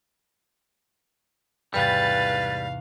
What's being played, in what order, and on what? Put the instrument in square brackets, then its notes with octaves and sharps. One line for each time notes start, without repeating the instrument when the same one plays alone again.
[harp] E2 G#2 C3 [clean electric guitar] G3 [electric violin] B4 A6 [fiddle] F5